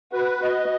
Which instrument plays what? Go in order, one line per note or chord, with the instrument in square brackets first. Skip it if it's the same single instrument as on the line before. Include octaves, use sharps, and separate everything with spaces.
[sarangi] F#4 [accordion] B4
[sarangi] F#4 [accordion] D#5